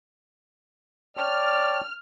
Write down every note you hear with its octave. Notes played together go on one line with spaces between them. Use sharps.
C#5 D5 G5 A5 F6